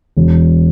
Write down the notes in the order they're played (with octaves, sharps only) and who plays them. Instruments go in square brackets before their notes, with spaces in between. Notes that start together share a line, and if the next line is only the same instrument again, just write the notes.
[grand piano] E1